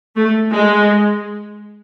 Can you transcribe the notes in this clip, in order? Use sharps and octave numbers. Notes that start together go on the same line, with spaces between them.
A3
G#3